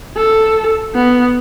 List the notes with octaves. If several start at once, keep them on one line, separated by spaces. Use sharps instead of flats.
A4
B3